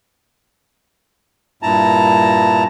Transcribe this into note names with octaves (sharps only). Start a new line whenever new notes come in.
G2 A#2 E4 A5 A#5